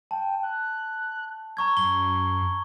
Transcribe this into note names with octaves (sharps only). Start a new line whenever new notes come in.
G5 A5
F#6
A#5 C#6 G#6
F#2 G7